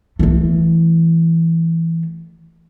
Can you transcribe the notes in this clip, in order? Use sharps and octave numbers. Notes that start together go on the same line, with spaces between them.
E3 A3